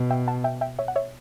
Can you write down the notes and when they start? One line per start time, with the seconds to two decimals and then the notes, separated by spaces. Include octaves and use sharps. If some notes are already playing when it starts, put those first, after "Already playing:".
Already playing: B2
0.10 E5 G5
0.27 F#5 A5
0.44 E5 G5
0.61 E5 G5
0.79 C#5 E5
0.88 F#5
0.96 C#5 E5